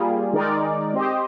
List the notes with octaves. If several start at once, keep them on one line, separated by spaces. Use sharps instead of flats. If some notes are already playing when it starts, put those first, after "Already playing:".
Already playing: G3 A#3 F4 G#4
D#3 G#3 D#4 A#4 D5
C4 G4 C5 D#5